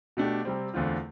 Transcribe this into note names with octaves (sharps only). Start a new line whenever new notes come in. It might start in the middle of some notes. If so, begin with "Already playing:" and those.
B2 A3 D4 G4
C3 G3 C4
E2 D3 A3 C4 F4